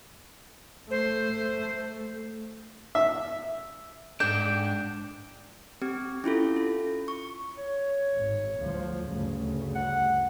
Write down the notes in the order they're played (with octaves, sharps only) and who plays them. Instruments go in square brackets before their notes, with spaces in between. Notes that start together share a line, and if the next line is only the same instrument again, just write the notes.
[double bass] A3 [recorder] C5
[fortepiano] E5
[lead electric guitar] G#2 D4 [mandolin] G5
[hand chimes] C4 G4
C#4 E4 F4 A4
F4
C#6
[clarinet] C#5
[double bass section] G#1
D2 F3
D2 G2 C#3
[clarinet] F#5